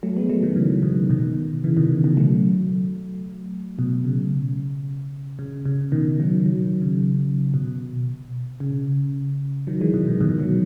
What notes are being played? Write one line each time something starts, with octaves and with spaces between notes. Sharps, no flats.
F#3 A3
G#3 B3
F#3 A3
D#3 F#3
C#3 E3
B2 D#3
B2 D#3
C#3 E3
B2 D#3
C#3
B2 D#3
F#3 A3
B2
C#3
C#3
C#3
B2 D#3
D#3 F#3
D#3 F#3
C#3
B2
C#3
D#3 F#3
E3 G#3
B2
B2 D#3
B2 D#3
D#3 F#3